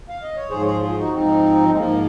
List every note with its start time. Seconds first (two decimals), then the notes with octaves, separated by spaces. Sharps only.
0.09 F5
0.22 D#5
0.36 C#5
0.50 G#2 F3 G#4 C5
0.60 C#5
0.66 G#4 C5
0.81 F4 G#4
0.94 F4
0.98 D#4 F#4
1.13 G#2 F3 C4 D#4
1.69 G#3
1.77 G#2 F3 A#3